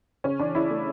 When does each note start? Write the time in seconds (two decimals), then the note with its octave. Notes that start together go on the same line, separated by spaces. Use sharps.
0.24 C#3 C#4
0.39 E3 D4
0.54 C#3 E4
0.70 A3